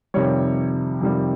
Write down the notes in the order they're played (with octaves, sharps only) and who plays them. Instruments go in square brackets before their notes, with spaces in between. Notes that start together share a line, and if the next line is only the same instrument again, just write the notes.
[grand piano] F2 C3 D#3 G3 C#5
F2 C3 D#3 G3